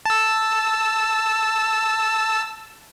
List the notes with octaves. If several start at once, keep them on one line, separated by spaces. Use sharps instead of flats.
A5 E6